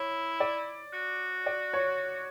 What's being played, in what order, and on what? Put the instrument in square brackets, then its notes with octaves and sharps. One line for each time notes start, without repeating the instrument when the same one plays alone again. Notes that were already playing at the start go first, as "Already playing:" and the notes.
Already playing: [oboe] E4 [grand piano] C#5
[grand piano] D5
[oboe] F#4
[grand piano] D5
C#5